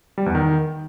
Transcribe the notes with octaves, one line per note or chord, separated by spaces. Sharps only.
G3
E2
D#3